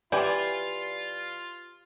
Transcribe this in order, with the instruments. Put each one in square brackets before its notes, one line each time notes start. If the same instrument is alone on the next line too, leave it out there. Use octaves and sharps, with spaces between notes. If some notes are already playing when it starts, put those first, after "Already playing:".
[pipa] E3 E4 G#5 [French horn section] F4 [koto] G4 [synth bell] D5